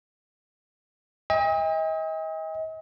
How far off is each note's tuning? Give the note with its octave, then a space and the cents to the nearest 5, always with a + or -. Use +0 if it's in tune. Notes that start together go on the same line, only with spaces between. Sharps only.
D#5 +40 G5 +45